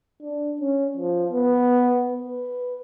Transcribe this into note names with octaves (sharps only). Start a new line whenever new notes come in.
D4
C#4
F3
B3
B4